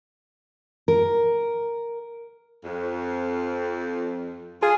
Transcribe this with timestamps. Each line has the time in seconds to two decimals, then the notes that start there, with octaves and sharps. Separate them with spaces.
0.88 A#4
2.64 F2
4.63 F4 G#4